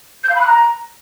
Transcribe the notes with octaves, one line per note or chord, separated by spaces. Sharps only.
G6
F5
B5
F#6
A#5